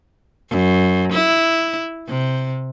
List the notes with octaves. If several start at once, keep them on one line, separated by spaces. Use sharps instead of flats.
F#2
E4
C3